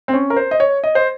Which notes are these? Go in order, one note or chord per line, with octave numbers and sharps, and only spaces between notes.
C4
C#4
A#4
C5
D#5
C#5
D#5
C5